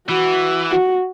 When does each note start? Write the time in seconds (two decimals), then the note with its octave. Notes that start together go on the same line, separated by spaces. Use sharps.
0.09 E3 F#4
0.71 F#4